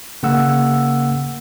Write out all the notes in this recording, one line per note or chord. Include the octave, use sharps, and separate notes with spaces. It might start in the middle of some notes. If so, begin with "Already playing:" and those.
C#3 A#3 F#5 E6